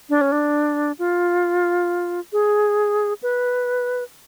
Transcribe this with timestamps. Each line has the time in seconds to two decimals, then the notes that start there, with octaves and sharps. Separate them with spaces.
0.10 D4
0.21 C#4
0.32 D4
0.99 F4
2.33 G#4
3.23 B4